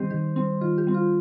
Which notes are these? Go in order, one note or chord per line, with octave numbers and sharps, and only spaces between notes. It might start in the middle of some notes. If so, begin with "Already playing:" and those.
Already playing: D#3 G3 C4 G4 C5 D#5
D#3 G4
G3 C4
D#3 F4
G4
G3 C4
F4